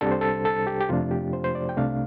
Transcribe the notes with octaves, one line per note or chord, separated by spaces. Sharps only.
C2 C3 G3 D4 A4
C5
A4
A4
G4
G4
F2 C3 F3 A3 D4 F4
G4
C5
C5
D5
G5
C2 C3 A3 D4 F5